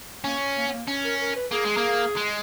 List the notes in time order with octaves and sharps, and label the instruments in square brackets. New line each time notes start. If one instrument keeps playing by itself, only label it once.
[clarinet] A#3 [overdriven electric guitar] C#4
[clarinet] A#3
B3
A#3
[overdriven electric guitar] C#4
[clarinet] A#4
A#4
B4
[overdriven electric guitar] A#3 [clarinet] G#4
[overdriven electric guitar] G#3
A#3
G#3